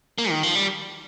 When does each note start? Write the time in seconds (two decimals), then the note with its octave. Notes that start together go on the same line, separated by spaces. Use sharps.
0.18 A#3
0.30 D#3
0.43 F3
0.55 G3